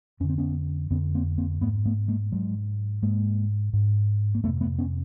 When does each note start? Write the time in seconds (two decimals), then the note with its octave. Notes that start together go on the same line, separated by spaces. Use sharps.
0.20 F2 D3 C#4
0.29 C4
0.38 B3 C#4
0.90 F2 D3 B3 C#4
1.15 A#3 C4
1.38 A#3 C4
1.61 G#2 A3 B3
1.85 A3 B3
2.08 G#3 A#3
2.32 G#2 F#3 G#3
3.02 G#2 G#3 A#3
3.73 G#2
4.35 A#3
4.44 F2 A3 B3
4.47 C3
4.61 A3 B3
4.78 B3 C#4